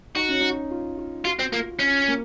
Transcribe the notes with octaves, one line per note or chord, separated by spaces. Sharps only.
D#4 F#4
C#4
D#4
F4
F4
F4 F#4
C4
A#3 F4
C#4
A#3